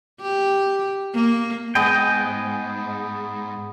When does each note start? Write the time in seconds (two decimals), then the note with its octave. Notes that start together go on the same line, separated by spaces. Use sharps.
0.21 G4
1.15 A#3
1.75 G#2 B3 G#4 D#5 G5